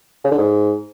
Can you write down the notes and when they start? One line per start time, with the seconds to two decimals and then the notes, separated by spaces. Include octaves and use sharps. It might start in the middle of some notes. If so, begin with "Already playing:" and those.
0.25 C#3
0.31 D3
0.38 G#2